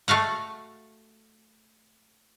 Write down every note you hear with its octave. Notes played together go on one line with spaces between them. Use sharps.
A3 F#4 F5 F#5